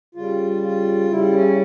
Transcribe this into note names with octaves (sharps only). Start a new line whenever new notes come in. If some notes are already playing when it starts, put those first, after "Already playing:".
C#3 G3 F4
F4
C#3 G3 E4
C#4